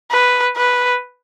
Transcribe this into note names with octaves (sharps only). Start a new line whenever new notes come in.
B4
B4